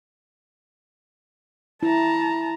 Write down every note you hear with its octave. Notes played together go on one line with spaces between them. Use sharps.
E4 A5 A#5